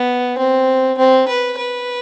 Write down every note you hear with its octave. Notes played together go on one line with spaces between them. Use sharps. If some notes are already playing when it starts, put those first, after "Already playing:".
Already playing: B3
C4
C4
B4
B4